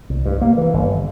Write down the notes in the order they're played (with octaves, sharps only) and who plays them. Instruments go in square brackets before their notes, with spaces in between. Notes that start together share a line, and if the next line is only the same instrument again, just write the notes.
[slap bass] C2
G2
A#3
E3
G1